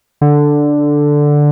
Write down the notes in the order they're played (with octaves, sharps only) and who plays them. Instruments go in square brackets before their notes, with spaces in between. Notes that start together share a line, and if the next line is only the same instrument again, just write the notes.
[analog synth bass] D3